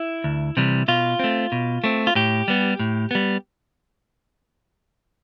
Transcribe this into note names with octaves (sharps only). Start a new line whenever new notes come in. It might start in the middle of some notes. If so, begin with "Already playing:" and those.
Already playing: E4
D2
C3 E3 G3
B2 F4
A3 C4
B2
A3 C4
F4
A2 G4
G3 B3
A2
G3 B3